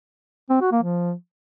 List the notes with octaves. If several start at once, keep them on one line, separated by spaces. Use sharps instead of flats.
C4
F#4
A#3
F3